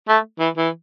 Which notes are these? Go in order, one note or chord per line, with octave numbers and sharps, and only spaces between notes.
A3
E3
E3